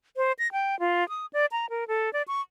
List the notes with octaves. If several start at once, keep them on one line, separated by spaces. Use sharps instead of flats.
C5
A#6
G5
F4
D#6
D5
A#5
A#4
A4
D5
C#6